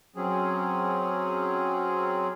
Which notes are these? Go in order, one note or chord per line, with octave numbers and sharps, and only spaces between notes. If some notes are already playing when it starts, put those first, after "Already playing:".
F#3 C4 C#4 G#4